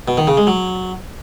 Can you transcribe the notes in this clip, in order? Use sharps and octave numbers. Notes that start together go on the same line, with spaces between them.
B2
D#3
C#3
G#3
F#3